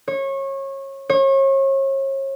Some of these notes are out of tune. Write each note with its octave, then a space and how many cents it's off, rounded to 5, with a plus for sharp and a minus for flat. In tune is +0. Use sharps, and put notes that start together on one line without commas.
C#5 -25
C#5 -35